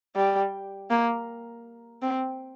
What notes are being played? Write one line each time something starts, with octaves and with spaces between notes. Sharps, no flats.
G3
A#3
C4